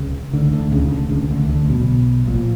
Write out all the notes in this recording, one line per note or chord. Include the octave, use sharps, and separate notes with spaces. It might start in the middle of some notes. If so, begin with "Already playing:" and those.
Already playing: C#2 C#3
D2 D3
D2 D3
C#2 C#3
D2 D3
C#2 C#3
D2 D3
D2 D3
B1 B2
A#1 A#2